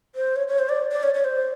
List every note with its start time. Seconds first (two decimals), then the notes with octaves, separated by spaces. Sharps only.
0.15 C5
0.36 C#5
0.48 C#5
0.59 C5
0.69 D5
0.92 D5
1.03 C#5
1.14 C#5
1.24 C5